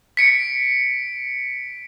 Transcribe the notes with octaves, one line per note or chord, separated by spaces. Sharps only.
B6 C#7 D7